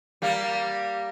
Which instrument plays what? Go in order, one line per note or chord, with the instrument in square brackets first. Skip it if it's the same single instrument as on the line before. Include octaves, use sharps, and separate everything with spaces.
[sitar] G3 A#3